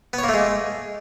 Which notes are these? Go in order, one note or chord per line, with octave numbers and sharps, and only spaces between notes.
B3
C#5
A#3
A3
G#3